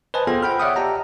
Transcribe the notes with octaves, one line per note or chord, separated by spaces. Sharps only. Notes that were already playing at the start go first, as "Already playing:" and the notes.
B4 C5 D#5 G#5 A5
B3 F4 G#4 A4 C5 G5
F#5 G5 B5 F6
C#5 D5 E5 F#5 G5 D#6
G4 D#5 A5 A#5